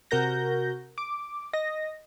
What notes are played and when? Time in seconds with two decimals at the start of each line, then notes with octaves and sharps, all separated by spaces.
0.11 C3 F#4 A#4 G6 A#6
0.98 D6
1.53 D#5 A#6